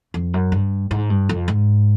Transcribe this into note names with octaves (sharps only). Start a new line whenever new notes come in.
F2
F#2
G2
G#2
G2
F2
G#2